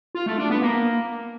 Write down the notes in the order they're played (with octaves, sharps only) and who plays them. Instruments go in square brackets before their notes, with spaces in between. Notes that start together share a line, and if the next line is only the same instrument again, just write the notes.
[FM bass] F4
A3
D4
B3
A#3